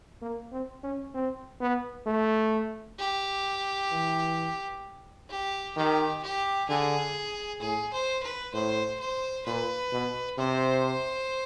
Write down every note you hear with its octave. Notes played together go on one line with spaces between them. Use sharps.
A#3
C4
C#4
C4
B3
A3
G4
E3
G4
D#3 G4
G4
D3 G#4
A2 G#4
C5
B4
A2 C5
C5
A#2 B4
B2
C3 C5